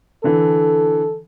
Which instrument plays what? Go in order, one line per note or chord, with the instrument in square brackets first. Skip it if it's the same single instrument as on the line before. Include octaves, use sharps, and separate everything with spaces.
[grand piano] D3 E3 [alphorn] A4